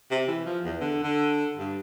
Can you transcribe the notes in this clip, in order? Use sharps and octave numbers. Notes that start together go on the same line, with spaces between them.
C3
E3
F3
E2
D3
D3
G2